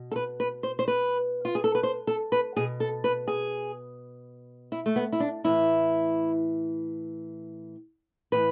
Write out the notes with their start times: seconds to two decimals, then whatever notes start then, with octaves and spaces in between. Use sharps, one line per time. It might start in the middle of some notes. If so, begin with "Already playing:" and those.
Already playing: B2
0.12 A4
0.16 B4
0.40 B4
0.63 C5
0.79 C5
0.88 B4
1.45 F4
1.55 G#4
1.64 A4
1.75 B4
1.83 C5
2.07 A4
2.32 B4
2.57 B2 G#4
2.80 A4
3.04 B4
3.28 G#4
4.72 E4
4.86 A3
4.96 B3
5.13 E4
5.20 D4
5.44 A2 E3 E4
8.32 A2 E3 B4